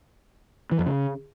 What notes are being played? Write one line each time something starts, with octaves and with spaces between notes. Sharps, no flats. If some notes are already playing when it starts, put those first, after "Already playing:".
E3
F2
C#3